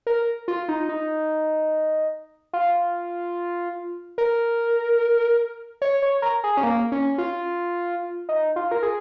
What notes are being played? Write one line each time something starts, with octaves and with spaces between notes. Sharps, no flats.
A#4
F4
D#4
D#4
F4
A#4
C#5
C#5
A#4
G#4
C#4
A#3
C#4
F4
D#4
F4
A#4
G#4